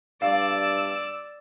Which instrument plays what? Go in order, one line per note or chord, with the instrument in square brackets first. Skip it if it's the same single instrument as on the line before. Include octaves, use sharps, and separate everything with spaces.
[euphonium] G2 [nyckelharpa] D5 [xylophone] F5 [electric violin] E6